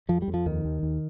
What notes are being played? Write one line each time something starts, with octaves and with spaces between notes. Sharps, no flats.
F2 F3
G3
F2
F3
D#2 D#3
D#2
D#2